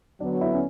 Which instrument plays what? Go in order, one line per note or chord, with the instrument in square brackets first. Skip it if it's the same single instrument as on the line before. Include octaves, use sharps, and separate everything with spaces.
[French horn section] D3 F#3 B3 [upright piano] D4
[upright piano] E4
C#4